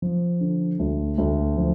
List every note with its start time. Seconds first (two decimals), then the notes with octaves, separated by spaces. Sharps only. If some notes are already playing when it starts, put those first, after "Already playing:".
0.02 F3
0.40 D3
0.79 D2
1.18 D2
1.57 F3